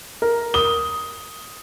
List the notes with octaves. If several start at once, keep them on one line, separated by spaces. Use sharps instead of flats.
A#4
D#6 G7